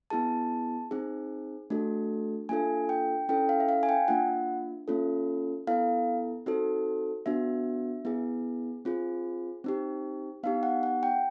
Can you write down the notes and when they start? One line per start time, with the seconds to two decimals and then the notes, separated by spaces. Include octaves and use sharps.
0.10 B3 E4 G#4 A5
0.91 C4 D#4 G#4
1.70 A3 D4 F#4 A4
2.49 A#3 D4 F4 A4 G#5
2.89 G5
3.29 C#4 E4 A4 G5
3.49 F5
3.60 E5
3.69 F5
3.83 G#5
3.89 G5
4.08 A#3 D4 F4 F#5
4.88 A#3 C#4 F4 A4
5.67 B3 E4 A4 F5
6.46 C4 D#4 F#4 A4
7.26 B3 D4 F#4 E5
8.05 B3 E4 G#4
8.85 C4 F4 G#4
9.64 C4 D#4 G4
10.43 B3 D#4 G4 F5
10.63 F#5
10.83 F#5
11.03 G5